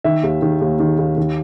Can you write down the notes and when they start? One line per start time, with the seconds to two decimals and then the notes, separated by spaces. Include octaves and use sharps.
0.04 D#3 E5
0.23 D#2
0.42 D#3
0.61 D#2
0.79 D#3
0.98 D#2
1.17 D#3